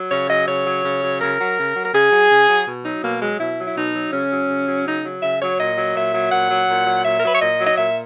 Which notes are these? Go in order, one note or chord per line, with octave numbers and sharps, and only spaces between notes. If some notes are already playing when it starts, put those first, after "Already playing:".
Already playing: F#3
C#3 C#5
F#3 D#5
C#3 C#5
F#3
C#3
F#3
C#3 A#4
F#3
C#3
F#3
A#4
C#3 G#4
F#3
C#3
F#3
B2
F#3 D#4
B2 A#3
F#3 G#3
B2 E4
F#3
E4
B2 D#4
F#3
C#3 C#4
F#3
C#3
F#3
C#3 D#4
F#3
C#3 E5
F#3 C#5
A#2 D#5
F#3
A#2 E5
F#3
A#2 F#5
F#3
A#2
F#3
A#2 E5
A#4
F#3 B4
C#5
A#2 D#5
F#3
D#5
A#2 E5